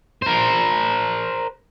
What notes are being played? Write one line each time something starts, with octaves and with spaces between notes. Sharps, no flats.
A#4 C5